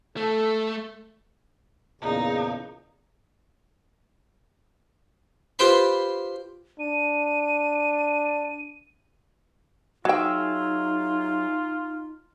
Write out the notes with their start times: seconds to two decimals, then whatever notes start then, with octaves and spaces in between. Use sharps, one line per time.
0.17 A3 A4
2.01 E2 A#2 C#3 D#4
5.59 F4 G4 B4 C5 G5 B5
6.80 D4 D#7
10.05 F#3 D#4 F4 F#4 G#4 E5 G5